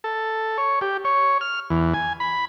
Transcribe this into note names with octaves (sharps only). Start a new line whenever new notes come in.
A4
C#5
G4
C#5
F6
E2
G#5
B5